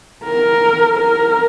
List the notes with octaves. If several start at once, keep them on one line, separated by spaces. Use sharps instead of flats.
A#4
A#4